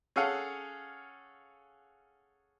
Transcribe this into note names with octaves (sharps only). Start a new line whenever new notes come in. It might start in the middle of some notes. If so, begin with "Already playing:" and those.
C#4 G#4 A4 F5 F#5